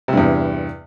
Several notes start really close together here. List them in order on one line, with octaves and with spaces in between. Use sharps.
C3 G2 E2